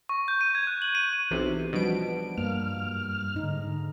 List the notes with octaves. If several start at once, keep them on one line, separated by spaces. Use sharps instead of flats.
C#6
G6
D#7
G#6
F#6
F#7
D#7
B1 C3 E3
B2 F3 G3 D4 D7
G2 A#3 F6
G#2 D3 D#4